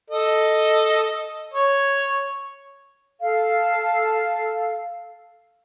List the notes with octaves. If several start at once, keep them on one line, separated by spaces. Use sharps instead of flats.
A4 D#5
C#5
A4 F5